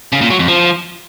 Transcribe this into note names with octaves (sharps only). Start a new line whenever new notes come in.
C#3
A#2
F#3
F2
F3